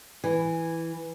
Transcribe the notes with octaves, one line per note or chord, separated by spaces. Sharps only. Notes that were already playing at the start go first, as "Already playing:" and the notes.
E3